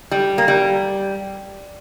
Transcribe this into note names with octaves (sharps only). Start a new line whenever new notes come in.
G3
A#3
G3